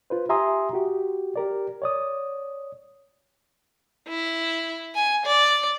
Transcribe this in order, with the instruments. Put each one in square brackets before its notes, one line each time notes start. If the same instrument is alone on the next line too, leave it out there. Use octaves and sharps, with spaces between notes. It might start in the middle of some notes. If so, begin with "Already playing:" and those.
[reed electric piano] F4 B4 C5
G4 E5 G#5 A#5 C6 D#6
F#4 G4
G4 A#4 D5
C#5 D5 D#6
[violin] E4
G#5
D5